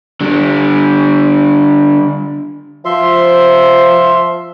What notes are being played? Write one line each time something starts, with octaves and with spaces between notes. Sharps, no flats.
D3 G3
F3 E5 C6